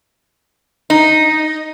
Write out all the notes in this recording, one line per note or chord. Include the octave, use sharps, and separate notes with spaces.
D#4